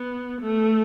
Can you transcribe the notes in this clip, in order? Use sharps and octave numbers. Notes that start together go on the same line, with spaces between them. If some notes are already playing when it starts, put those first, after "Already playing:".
Already playing: B3
A3